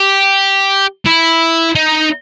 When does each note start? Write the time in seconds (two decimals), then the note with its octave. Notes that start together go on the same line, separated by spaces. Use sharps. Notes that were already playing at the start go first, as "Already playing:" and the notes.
Already playing: G4
1.06 E4
1.75 D#4